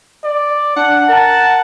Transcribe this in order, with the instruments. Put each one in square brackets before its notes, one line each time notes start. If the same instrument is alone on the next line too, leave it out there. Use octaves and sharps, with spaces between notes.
[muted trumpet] D5
[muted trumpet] D4 [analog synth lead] F#5
[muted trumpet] A#4 [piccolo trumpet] A5